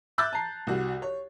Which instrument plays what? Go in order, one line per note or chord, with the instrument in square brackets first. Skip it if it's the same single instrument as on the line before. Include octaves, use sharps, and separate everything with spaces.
[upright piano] E5 D6 E6 F#6 G6 A6
A5 A#5 C7
C2 F#4
C#5